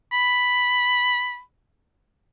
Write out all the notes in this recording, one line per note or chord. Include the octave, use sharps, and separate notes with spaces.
B5